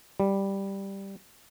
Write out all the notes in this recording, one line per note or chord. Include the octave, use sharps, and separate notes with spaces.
G3